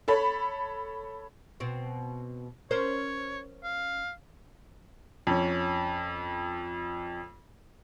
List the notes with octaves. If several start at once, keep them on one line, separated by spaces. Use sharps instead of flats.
A4 C#5 B5
B2 C4
C#4 A#4 C5 C#5
F5
F2 C#4